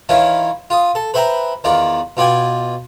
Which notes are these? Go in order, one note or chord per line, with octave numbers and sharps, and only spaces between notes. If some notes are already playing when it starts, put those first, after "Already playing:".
D#3 E3 C#4 E4 F4
F4 D#6
A4
B4 C5 E5 G5 A#5
E2 D#3 F4 D5
B2 F4 D5 G5 G#5